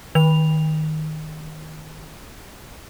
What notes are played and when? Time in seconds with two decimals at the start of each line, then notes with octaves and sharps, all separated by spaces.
0.15 D#3 F7